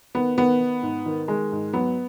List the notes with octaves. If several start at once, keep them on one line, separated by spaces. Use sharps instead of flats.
D#3 B3
D#3 B3
D#3
G#2
D#3
D#3 G#3
G#2
F#3 B3